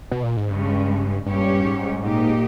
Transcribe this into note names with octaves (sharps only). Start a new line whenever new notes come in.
B2
A#2
G#2
G2 C#3 G#3 C#4
G2 A#2 G3 C#4 G4 C#5
G#2
A#2 A#3 D#4 G4